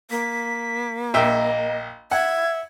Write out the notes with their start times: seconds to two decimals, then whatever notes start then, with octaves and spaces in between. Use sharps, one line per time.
0.11 A#3 B6
1.14 A#1 D#5 E5 G5
2.11 E5 F#5 G#6